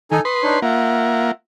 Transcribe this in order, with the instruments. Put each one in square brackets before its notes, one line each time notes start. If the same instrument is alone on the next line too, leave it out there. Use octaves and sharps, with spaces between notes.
[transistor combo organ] D#3 [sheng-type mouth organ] D#4 A4 G#5
[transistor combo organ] B4 C6 [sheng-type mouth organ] D#6
[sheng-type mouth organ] D4 D#4 C#5
[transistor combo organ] A#3 [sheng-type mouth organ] F4 E5 F#5